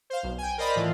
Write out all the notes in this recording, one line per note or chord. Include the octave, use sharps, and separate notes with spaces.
C5 F5
B1
G5 G#5
A#4 C5 D5 D#5 B5
A2 E3 F4